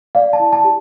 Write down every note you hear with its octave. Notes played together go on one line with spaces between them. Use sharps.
D5 F5
A5
E4
A5
G4